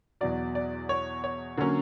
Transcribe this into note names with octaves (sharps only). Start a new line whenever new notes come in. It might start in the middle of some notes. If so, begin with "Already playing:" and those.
E2 B2 F#3 D5
D5
C#5
C#5
D3 F#3 A#3 C#4